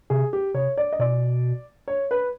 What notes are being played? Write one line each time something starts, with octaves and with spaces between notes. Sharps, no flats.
C3 G#4
G4
C3 C#5
D5
D#5
B2 D5
C#5
B4